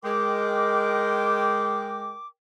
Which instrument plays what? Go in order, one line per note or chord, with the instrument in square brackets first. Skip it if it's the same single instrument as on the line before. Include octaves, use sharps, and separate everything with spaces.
[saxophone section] G#3 [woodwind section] A#4 G5 D6